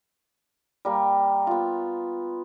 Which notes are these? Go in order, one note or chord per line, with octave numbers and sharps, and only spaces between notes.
G3 A#3
B3 F4